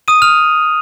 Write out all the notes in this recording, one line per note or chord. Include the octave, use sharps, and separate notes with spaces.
D#6 D#7
F6 F7